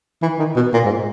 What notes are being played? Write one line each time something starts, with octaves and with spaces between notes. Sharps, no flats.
E3
D#3
B2
A#2
G#2